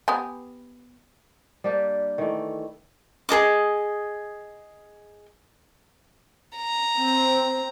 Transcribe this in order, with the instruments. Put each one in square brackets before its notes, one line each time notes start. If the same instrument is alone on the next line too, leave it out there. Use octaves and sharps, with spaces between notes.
[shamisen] B3 G4 G#5
[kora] G3 A#3 D4 G4
D#3 E3 A3
[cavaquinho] G#4 A4 D#5 D6
[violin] A#5
[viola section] C4